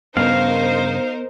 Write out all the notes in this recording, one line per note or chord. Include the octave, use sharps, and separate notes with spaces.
G2 C#3 B3 D#4 A#4 C5 F5